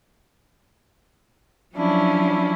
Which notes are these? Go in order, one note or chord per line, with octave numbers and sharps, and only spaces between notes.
F3 F#3 C#4 D4 E4